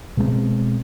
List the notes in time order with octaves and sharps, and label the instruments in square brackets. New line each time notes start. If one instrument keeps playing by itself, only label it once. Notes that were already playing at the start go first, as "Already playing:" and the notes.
[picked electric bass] B2 G#3 A3 C4